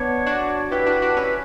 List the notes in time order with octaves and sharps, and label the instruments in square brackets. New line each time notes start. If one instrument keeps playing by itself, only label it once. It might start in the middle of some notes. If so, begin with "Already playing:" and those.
Already playing: [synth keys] B3 D4 [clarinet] C#5
[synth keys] D4 F#4
[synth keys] E4 G4 [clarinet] B4
[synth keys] D4 F#4
D4 F#4
C#4 E4